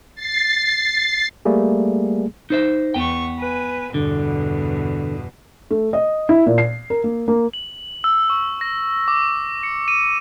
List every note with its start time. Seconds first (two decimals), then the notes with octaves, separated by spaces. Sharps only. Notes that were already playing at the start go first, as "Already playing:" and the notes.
0.15 A6 C7
1.45 G3 A3 A#3 G#4
2.50 D#4 C5 E5
2.94 E2 B3 G5 C#6
3.38 B4 G#5
3.94 E2 G2 B2 D3
5.71 A3
5.93 D#5
6.29 E4
6.46 A#2
6.58 C7
6.90 A#4
7.04 A#3
7.28 A#3
7.53 F#7
8.04 E6
8.30 C#6
8.61 A#6
9.08 D6
9.63 C#7
9.88 D#7